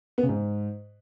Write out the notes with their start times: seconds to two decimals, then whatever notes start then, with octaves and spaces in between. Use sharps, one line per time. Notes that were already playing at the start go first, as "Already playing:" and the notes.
0.18 B3
0.23 C#3
0.29 G#2